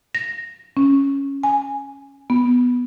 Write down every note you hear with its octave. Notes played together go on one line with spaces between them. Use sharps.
A#6
C#4
G#5
B3